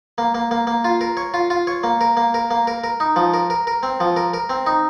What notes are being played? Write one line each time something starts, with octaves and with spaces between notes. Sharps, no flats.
A#3
A#3
A#3
A#3
F4
A#4
C#5
F4
F4
C#5
A#3
A#4
A#3
A#4
A#3
A#4
A#4
D#4
F3
A#4
A#4
A#4
C4
F3
A#4
A#4
C4
D#4